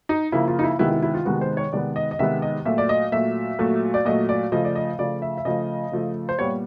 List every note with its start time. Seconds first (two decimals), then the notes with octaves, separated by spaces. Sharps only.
0.09 D#4
0.32 C#3 F3 A#3 E4
0.48 F4
0.59 D#4
0.63 E4
0.79 C3 D#3 G#3 B3 E4
0.91 E4
1.02 E4
1.14 F4
1.25 C3 D#3 G#3 B3 F#4
1.41 C5
1.57 C#5
1.72 C3 D#3 G#3 B3 D5
1.96 D#5
2.11 D#5
2.19 C3 D#3 G#3 B3 E5
2.42 D#5
2.65 A#2 F#3 A3 E5
2.78 D5
2.89 D#5
3.12 A#2 F#3 A3 E5
3.59 A#2 F#3 A3
3.94 D5
4.05 A#2 F#3 A3 D#5
4.29 D5
4.52 C#3 F3 A3 D#5
4.65 D5
4.75 D#5
4.99 C#3 F3 A3 D5
5.22 E5
5.37 E5
5.45 C#3 F3 A3 D#5
5.92 C#3 F3 A3
6.29 C5
6.39 A#2 G3 B3 C#5